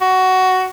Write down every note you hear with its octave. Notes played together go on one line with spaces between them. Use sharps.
F#4